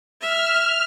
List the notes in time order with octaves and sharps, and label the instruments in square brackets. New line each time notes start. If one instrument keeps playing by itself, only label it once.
[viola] E5 [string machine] F6